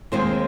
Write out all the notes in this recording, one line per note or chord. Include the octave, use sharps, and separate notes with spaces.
D#2 D#3 G#3 C4 C5